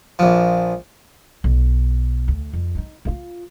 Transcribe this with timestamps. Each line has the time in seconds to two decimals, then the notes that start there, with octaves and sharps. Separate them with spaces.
0.19 A#1 F3
1.44 B1
2.28 D2
2.53 F2
2.75 B3 D#4
3.05 G2 F4